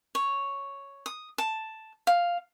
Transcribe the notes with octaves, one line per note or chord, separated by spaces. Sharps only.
C#5
D#6
A5
F5